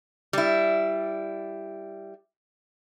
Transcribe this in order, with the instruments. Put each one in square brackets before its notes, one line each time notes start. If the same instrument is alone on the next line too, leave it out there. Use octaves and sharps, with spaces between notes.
[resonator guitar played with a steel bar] G3 E4